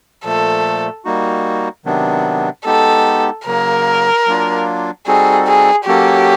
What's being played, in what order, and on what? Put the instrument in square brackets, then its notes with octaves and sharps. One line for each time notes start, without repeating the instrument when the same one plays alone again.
[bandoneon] A#2 F3 A3 [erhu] A4
[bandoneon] G3 A#3 D#4 F#4
C3 D#3 F#3 B3 D4
[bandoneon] G#3 B3 D#4 G4 [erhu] A4
[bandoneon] C#3 F#3 A#3 [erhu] A#4
[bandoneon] F#3 A#3 D4 F4
[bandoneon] G3 C4 D#4 F#4 A4 [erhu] G#4
[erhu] G#4
[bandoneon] F#3 A#3 C#4 F#4 A4 [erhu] G4